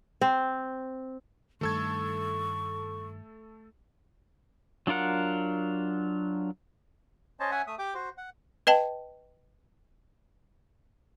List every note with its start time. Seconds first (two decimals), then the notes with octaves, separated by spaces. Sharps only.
0.21 C4
1.61 G2 D#3 A3 A4 C#6 G#6
4.87 F#3 D4 F4 A#4 F#5
7.40 C#4 C5 C#5 D#5 A5
7.51 C#4 E5 F#5 G#5
7.67 A3 E5 D#6
7.79 G4 G5 D6
7.94 F#4 C5
8.18 F#5
8.67 B4 D#5 G5 A5